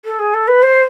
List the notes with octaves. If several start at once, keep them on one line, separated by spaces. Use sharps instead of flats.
A4
G#4
A4
B4
C5